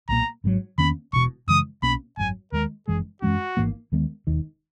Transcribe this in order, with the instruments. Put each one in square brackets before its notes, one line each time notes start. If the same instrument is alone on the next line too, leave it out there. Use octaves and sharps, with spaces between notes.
[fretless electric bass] B1 A#2 A#3 [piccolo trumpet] A#5
[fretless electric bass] G#1 G#2 D#3 F#3
[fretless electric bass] E2 D#3 A#3 C#4 [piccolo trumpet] B5
[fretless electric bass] E1 E2 B2 [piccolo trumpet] C#6
[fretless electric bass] F#2 C#3 E3 G#3 [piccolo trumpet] D#6
[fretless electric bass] B1 B2 A#3 C#4 [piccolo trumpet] B5
[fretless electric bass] G#1 F#2 D#3 F#3 [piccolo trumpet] G#5
[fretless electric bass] D#2 D#3 G#3 [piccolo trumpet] A#4
[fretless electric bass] F#1 F#2 E3 G#3 [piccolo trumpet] G#4
[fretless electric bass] F#2 E3 G#3 C#4 [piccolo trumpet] F#4
[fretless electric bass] G#1 G#2 E3 A#3
D#2 D#3 G#3 B3
E1 D#2 D#3